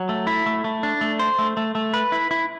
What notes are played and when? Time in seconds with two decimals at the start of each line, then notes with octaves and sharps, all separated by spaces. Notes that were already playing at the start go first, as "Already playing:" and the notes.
Already playing: F#3
0.09 A3
0.27 E4
0.46 A3
0.64 A3
0.83 D4
1.01 A3
1.19 C5
1.39 A3
1.57 A3
1.75 A3
1.94 B4
2.12 E4
2.31 E4